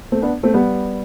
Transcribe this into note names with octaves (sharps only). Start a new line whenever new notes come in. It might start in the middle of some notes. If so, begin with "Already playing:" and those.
A3 C4
B3 D4
A3 C4
G3 B3